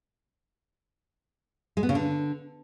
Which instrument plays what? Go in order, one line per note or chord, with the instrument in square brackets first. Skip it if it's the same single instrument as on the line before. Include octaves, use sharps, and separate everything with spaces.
[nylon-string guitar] G#3
B3
C#3
D3